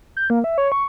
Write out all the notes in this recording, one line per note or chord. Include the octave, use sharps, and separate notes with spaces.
G6
A#3
E5
C#5
C#6